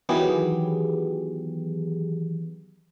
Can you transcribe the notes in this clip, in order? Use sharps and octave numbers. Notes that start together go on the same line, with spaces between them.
D#3 E3 F#3 B3 G4 G#4